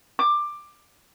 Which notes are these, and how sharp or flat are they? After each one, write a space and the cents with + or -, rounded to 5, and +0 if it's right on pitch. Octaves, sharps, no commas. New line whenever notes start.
D6 +15